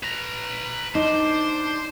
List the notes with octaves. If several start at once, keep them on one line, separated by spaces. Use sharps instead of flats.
B4 A#5
D4 D#4 C5